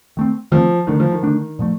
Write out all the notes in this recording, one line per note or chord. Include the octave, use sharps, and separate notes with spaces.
D#3 A3 C4
D#3 F3 A3 C4
D3 D#3 A3 D4
F3
D#3
D3 A3 D4
A#2 F3 A3